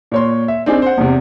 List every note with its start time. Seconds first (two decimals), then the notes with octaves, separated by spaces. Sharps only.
0.12 A#2 C#5 C6
0.48 E5
0.66 C4 D4 D#4 G#4
0.82 C5 F#5
0.97 E2 C3